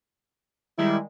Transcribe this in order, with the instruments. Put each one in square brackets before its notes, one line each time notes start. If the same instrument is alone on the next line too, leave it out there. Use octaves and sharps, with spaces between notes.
[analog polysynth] D#3 G3 G#3 [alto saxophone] E4